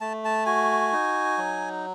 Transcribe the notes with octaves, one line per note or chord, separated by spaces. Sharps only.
A3 A5
A5
F#4 G#5
D#4
F#3